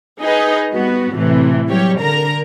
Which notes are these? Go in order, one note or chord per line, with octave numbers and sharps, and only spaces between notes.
D#4 G#4 B4 D#5
G3 B3 F#4
A2 C3 E3
F#3 G3 G4 C#5
D3 A#4 A#5